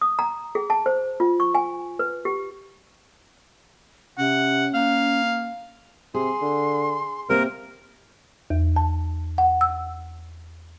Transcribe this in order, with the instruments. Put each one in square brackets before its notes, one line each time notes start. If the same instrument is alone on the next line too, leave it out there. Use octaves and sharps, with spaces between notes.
[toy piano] D#6
A#5
G#4
A5
C5
F4
C#6
G#5
B4
G4
[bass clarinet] C3 [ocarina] C#4 [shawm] F#5
[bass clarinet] A#3 [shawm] F5
[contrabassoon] C3 [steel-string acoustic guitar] G#4 [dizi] C6
[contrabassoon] D3
[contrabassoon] C3 [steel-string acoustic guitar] A#3 C4 [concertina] A#4
[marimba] E2
A5
F#5
E6